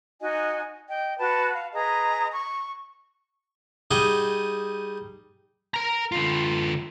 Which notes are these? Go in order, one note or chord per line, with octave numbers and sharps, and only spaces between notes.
D#4 F#4 D#5 G#5
D#5 G5
F#4 B4 A5
F5
G#4 B4 D#5 A#5
C#6
G3 D#4 G#4 F#5
A#4 A#5
D3 F4